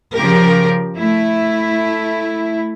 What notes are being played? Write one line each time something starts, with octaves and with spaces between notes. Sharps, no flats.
C#3 F3 G4 A#4
A3 E4